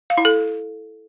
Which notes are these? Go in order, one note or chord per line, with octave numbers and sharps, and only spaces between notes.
F5
E4
A4